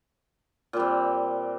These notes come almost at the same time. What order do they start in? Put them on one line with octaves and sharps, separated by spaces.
A#2 G3 C4